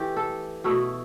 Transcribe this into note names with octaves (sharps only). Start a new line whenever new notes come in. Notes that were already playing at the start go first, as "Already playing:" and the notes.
Already playing: E3 A3 E4 G4
A4
B2 A3 E4